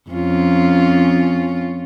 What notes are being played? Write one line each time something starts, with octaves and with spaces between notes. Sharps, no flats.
F2 C#4 F4